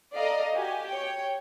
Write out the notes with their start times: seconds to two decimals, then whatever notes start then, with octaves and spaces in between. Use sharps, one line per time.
0.15 A4 D5 D#5 F5 A#5
0.55 F#4 G4 G#5
0.88 C#5 G5